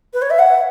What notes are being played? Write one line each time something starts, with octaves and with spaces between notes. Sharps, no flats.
B4
C#5
E5
F#5